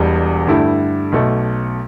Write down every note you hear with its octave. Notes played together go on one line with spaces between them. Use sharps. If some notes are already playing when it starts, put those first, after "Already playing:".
Already playing: E1 E2 B2 G3
G2 D3 A3 E4 G4
B1 B2 A3